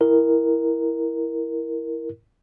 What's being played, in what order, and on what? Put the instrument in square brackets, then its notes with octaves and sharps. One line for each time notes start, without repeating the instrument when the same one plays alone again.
[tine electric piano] E4 A#4